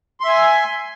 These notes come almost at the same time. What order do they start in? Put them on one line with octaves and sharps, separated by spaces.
C6 E5 G#5